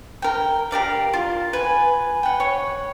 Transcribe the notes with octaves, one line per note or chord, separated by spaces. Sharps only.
A#4 G5
G4 A#4 D5 F5
F4
B4 G#5
F#5 G5
C#5